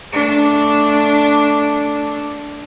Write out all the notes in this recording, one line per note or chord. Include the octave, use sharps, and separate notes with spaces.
A3 D4